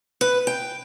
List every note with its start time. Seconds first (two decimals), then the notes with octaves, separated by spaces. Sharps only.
0.21 B4
0.47 G5